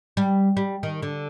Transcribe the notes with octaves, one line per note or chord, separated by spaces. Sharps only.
G3
G3
D#3
D3